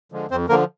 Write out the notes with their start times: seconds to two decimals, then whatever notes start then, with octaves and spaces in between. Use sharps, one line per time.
0.12 D3 F3 G#3
0.31 F2 C4 C5
0.49 D3 F3 A#3 A#4